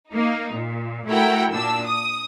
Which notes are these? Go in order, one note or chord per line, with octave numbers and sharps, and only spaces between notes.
A#3 D#4
A#2
A3 E4 F#4 A#4 F#5 G5
A#2 D4 E6
D#6